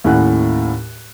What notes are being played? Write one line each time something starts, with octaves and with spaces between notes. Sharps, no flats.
D#2 A2 C#4 E4 F#5 F#6